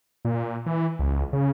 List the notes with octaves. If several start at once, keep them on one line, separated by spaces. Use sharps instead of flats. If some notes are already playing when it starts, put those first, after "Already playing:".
A#2
E3
C#2
C#3